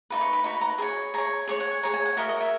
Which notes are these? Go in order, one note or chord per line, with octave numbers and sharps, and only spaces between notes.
D#4 F#4 B4
C#6
B5
D#4 F#4 B4 B5
A#5
G#4 C#5 G#5
G#4 C#5 A#5
G#4 C#5 C#6
F#5
G#5
G#4 C#5 A#5
G#5
F#5
F#4 A#4 D#5 E5
D#5
E5